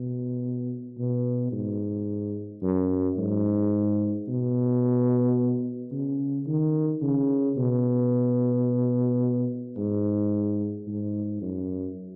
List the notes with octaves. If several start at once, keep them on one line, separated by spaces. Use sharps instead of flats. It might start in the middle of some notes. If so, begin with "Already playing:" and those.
Already playing: B2
B2
G#2
F#2
G#2
B2
C#3
D#3
C#3
B2
G#2
G#2
F#2